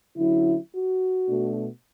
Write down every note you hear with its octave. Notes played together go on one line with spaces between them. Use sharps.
D3 F#3 C#4 E4
F#4
B2 A3 D4